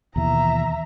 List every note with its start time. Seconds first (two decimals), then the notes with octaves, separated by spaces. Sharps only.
0.16 D#2 B2 E3 E5 A#5